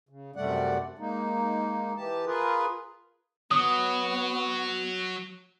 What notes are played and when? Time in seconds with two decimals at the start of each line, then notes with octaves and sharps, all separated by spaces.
0.09 C#3
0.36 F#2 C3 G3 A3 D5 F#5
0.99 G#3 A#3 D#4
1.97 E3 G4 A5
2.26 F4 G#4 A#4 B4
3.51 F#3 B3 D#6